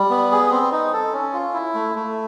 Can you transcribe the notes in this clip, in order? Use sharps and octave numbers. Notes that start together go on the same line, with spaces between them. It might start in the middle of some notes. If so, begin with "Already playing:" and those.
Already playing: G3
B3
G#4
C4
D#4
A4
C#4
F4
E4
A3
A3